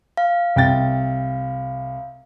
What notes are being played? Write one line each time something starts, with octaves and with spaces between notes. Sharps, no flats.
F5
C2 G5 A6